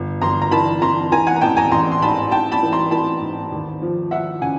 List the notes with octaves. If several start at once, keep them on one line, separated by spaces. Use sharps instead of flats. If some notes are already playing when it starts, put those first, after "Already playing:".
Already playing: G1
G1 A#5 C6
A#5
E3 A5 B5
E3 A#5 C6
E3 G#5 A#5
F#5 G#5
A#5
A1 G5 A5
G#5 A#5
A1 A#5 C6
C6
G#2 A5 B5
G#2 G5 A5
A5 B5
E3
A#5 C6
E3 A5 B5
G#2
D#2
F3
F3 E5 F#5
C#3 F#5 G#5